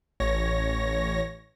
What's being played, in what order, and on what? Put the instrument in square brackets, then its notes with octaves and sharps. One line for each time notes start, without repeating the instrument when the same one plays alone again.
[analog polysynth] A1 C#5 A#6